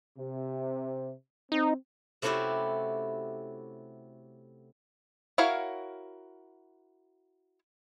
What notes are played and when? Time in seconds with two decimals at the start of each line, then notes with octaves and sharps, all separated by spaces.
0.18 C3
1.52 C4 D#4
2.22 C3 A3 C#4 E4 F#4 G4
5.38 E4 F#4 A#4 C#5 F5